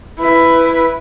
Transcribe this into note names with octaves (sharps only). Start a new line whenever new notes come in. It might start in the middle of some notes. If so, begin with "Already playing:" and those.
E4 B4